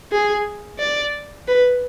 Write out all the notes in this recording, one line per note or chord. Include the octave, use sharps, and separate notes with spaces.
G#4
D5
B4